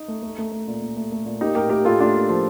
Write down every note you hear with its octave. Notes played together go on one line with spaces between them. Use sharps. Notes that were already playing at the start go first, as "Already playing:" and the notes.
Already playing: D#4
A3
A3
A3
A3
A#2
A#2
A3
A3
A#2
A#3 D#4 G4
A2 G4 A#4
A2 G4 A#4
A2 F4 A4
A2 D4 F4
A#3
F3